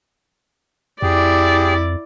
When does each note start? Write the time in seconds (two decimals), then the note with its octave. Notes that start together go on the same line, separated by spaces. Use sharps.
1.02 F2 E4 G4 G#4 D5